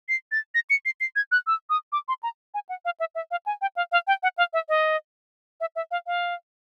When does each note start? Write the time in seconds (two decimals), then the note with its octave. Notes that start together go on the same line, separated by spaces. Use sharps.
0.09 C7
0.32 A6
0.55 A#6
0.70 C#7
0.85 C7
1.00 C7
1.16 G#6
1.32 F#6
1.47 E6
1.70 D#6
1.92 D6
2.08 C6
2.23 A#5
2.54 G#5
2.69 F#5
2.85 F5
3.00 E5
3.15 E5
3.31 F5
3.46 G#5
3.62 G5
3.76 F5
3.92 F5
4.07 G5
4.23 F#5
4.38 F5
4.53 E5
4.69 D#5
5.61 E5
5.76 E5
5.91 F5
6.07 F5